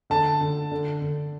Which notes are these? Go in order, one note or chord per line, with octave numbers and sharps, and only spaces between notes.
D3 A5
D3
D3
D3